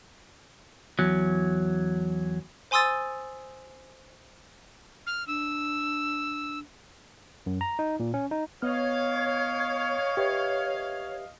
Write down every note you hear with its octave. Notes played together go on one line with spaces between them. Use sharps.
E2 F#3
C5 G#5 C6 D#6 E6 A6
F6
D4 E6
F#2
A#5
D#4
A#2
C#4
D#4
B3 C#5 D#5 F5 F6
G4 B4 E5